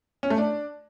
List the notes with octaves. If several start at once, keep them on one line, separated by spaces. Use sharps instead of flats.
C#4
A3
D4